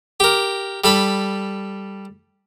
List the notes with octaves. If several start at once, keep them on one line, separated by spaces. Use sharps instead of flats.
G4 A#4
G3 A4 B5